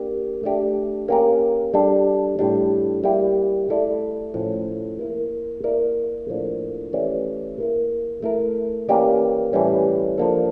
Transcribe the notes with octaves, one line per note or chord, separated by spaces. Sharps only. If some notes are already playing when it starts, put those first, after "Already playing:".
Already playing: A#3 D4 G4
A3 D4 G4
A#3 C#4 G4 A#4
G3 D4 A4
A2 G3 D4
G3 A#3 E4 G4
A3 E4 A4 D5
A2 F3 C#4
A#3 E4 A#4
A#3 E4 A#4 D5
A2 F3 A#3 D4
E3 A3 C#4 G4 D5
A#3 E4 A#4
A3 E4 A#4
E3 A#3 C#4 G4 D5
A2 E3 G3 C#4
F3 A#3 D4 A4